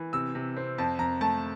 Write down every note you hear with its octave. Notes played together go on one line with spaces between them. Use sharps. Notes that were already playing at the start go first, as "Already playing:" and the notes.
Already playing: E3
C3 E6
C3
C4
F2 A5
F2 A#5
A3 A5